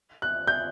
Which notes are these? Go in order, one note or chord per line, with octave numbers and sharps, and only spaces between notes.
F#6
G6